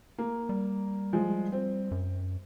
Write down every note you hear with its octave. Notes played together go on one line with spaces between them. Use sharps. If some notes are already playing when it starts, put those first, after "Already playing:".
A#3
G3
F3 G#3
C4
F#2